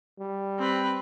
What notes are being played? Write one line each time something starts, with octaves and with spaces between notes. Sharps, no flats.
G3
C4 B4